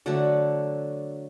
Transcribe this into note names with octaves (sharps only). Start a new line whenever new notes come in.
D3 F#3 A3 D5 F#5